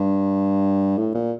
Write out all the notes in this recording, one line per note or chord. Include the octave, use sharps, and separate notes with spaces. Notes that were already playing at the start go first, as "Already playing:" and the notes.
Already playing: G2
A2
A#2